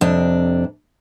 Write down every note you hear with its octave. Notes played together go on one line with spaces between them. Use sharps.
F2 C3 D4